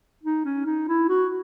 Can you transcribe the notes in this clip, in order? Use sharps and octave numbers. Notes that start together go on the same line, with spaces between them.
D#4
C#4
D#4
E4
F#4